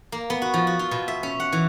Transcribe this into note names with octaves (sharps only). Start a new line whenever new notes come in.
A#3
B3
F#4
F3
F#4
F4
B2
E5
C#4
F#5
E3